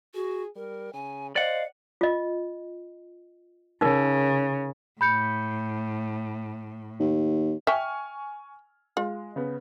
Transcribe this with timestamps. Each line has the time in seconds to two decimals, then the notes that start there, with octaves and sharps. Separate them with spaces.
0.14 F#4 G#4
0.56 G3 A#4
0.93 C#3 G#5
1.36 C5 D5 D#5 F5 F#5
2.01 F4 D#5
3.81 C#3 D#4 A#4
5.01 A2 B5 G6 C#7
7.00 D#2
7.67 E5 G5 G#5 C#6 F6
8.97 G#3 F4
9.36 C#3 B3